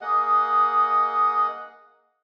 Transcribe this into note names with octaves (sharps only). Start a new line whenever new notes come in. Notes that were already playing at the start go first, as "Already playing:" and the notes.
A#3 G#4 D#5 F#5